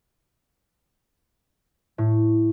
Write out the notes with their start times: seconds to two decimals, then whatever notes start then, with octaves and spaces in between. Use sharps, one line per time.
1.98 A2